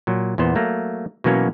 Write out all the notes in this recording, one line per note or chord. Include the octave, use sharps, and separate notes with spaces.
A#2 F#3
E2 A#2 B3 C5
F#3 A3 A#3
B2 E3 F#3 A#3 C#4